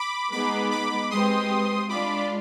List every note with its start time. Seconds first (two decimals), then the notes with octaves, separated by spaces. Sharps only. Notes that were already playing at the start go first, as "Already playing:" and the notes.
Already playing: B5 D6
0.32 G#3 B3 D#4 G#4 B5 D6
0.71 B5 D6
1.10 G#3 C4 G4 B4 C6 D#6
1.89 G#3 D4 F4 B5 D6